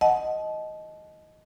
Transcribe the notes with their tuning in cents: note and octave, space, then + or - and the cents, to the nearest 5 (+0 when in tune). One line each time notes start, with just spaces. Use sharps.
D#5 +0 F#5 +0 A5 -30